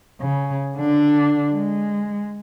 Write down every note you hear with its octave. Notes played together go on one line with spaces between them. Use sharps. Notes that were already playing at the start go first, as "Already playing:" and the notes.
C#3
D3 D4
G#3